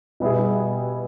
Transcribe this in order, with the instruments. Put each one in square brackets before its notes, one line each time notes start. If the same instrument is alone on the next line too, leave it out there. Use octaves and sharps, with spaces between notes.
[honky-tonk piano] B2 G3 B3 E4 G#4